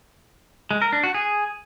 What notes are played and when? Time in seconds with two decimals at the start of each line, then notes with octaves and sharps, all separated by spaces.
0.71 G#3
0.82 A#4
0.93 D4
1.03 F#4
1.14 G#4